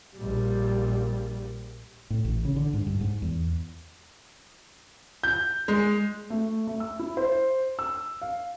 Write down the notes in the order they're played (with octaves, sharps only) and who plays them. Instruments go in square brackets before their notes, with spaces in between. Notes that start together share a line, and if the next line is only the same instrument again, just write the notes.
[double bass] A#1 G3
[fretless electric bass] A2
A1
C#3
D3
G#2
G2
G#2
E2
[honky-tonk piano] G6
G#3
[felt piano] A3
A3
E6
E4
C5
E6
F5